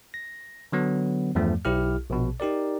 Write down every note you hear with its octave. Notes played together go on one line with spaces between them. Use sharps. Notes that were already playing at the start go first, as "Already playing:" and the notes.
A#6
D3 F#3 B3
E2 G2 F3 A3
B1 E4 G4 F6
A#1 B2
D#4 G4 A#4 D5